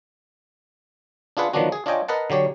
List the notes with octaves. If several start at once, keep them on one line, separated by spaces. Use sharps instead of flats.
D4 F4 G#4 B4 F#5
D#3 F3 F#3 B3 D4 F#4
G#4
D4 F4 C#5 D#5 G5 G#5
A#4 B4 D#5 F#5 A5
D3 F#3 G4 C#5